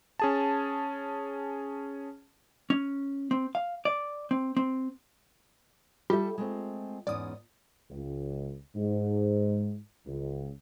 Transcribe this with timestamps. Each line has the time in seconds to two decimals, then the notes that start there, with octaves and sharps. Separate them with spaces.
0.19 C#4 G#4 A5
2.70 C#4
3.31 C4
3.55 F5
3.85 D5
4.31 C4
4.57 C4
6.10 G3 F4 G4 A4 E5
6.38 G#3 A3 C4
7.07 E2 G#2 C#4 D5 D#6
7.90 C#2
8.76 G#2
10.07 C#2